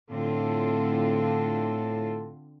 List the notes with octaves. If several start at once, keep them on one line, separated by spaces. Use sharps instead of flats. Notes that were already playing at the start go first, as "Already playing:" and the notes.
A2 D3 C4 F4 A4